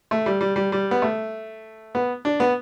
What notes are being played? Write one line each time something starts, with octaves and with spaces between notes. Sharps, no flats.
A3
G3
G3
G3
G3
B3
A3
B3
D4
B3